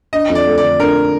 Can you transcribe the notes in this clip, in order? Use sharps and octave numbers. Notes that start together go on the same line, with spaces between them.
D4 D#5
F2
D5
A3
D3 D5
D4 A#4